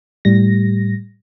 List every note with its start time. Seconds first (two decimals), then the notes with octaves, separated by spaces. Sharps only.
0.25 A2 G3 A#6